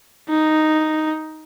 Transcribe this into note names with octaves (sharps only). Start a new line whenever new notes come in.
D#4